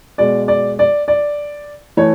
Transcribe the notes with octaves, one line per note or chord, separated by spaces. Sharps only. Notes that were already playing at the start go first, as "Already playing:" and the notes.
B2 G#3 D5
D5
D5
D5
E3 A3 C#5